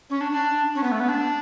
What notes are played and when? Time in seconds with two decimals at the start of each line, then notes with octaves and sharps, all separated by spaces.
0.10 C#4
0.21 D4
0.32 D4
0.75 C#4
0.83 B3
0.92 A3
1.00 B3
1.09 D4